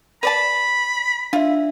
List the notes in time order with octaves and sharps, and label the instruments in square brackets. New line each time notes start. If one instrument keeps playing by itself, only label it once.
[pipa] B4 D5 A5 [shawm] B5
[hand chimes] D4 E5 [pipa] F4